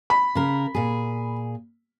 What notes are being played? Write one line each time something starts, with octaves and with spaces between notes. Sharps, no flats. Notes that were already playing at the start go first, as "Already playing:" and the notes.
B5
C#3 A#4
A#2 G#4